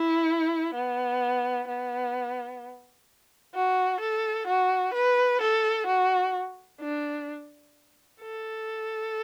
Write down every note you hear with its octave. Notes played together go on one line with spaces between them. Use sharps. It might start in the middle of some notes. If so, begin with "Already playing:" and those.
Already playing: E4
B3
B3
F#4
A4
F#4
B4
A4
F#4
D4
A4